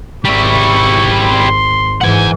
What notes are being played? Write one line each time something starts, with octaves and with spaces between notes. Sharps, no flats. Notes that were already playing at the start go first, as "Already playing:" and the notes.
G#1 G3 E4 C#6
C6
G#2 E3 F#5 G#5